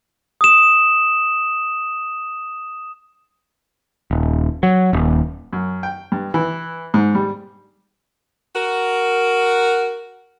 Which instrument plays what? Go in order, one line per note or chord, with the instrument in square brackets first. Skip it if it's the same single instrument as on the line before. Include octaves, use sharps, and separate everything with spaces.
[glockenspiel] D#6 E7
[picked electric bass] D#1
F#3
D#1
[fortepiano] F#2
G5
G2
E3
G#2
G3
[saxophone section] F#4 A#4